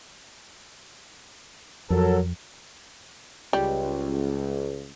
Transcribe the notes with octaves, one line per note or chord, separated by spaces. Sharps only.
F2 F#3 A4 A#4
C#2 G3